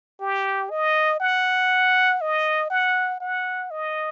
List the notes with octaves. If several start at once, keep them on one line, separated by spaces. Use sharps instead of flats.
G4
D#5
F#5
D#5
F#5
F#5
D#5